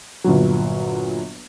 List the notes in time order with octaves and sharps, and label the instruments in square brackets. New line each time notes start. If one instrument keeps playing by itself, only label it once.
[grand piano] G1 A#2 F#3